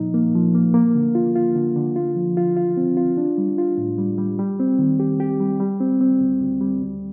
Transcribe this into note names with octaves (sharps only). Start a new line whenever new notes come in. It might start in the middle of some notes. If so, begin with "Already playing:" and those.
Already playing: A#2 F3 D#4
A#3
F3
A#3
A#3
D3
F4
F4
D3
D3
F4
F3
F4
F4
C4
F4
D4
G3
F4
A2
G3
G3
G3
C4
D#3
G4
G4
G3
G3
C4
C4
D2
D2
G3
D2